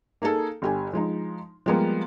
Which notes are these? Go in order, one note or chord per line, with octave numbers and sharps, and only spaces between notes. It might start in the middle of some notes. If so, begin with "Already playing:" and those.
A#3 D#4 G#4 A4
G1 G4 G#5
F3 G#3 D#4
F3 G3 G#3 A#3 B3